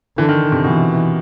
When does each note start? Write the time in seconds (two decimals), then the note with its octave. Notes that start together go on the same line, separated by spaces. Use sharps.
0.18 D3 E3
0.29 D#3
0.52 C3
0.64 B2 E3